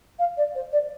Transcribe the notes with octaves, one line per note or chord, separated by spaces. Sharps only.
F5
D5
C5
D5